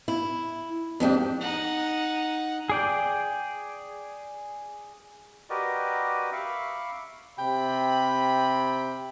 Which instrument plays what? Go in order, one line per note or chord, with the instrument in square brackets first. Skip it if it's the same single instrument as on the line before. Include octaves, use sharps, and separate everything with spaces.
[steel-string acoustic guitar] E4
F2 G#2 D4 G4
[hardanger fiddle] D#4 F#5
[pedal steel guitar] G#4 D5 G5
[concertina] F#4 G4 A#4 B4 D5 D#5
E5 F5 B5 C#6 D6
[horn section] C3 G5 B5